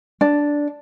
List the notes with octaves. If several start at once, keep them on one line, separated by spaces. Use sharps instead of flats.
D4